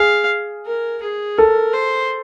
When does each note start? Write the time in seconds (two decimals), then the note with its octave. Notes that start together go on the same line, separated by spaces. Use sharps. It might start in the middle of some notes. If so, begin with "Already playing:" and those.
Already playing: G#4 F5
0.66 A#4
1.03 G#4
1.37 A4 A#4
1.73 C5